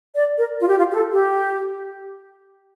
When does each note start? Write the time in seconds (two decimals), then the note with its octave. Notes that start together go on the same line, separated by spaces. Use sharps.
0.15 D5
0.37 A#4
0.60 F4
0.69 G4
0.77 F4
0.91 G4
0.94 A4
1.12 G4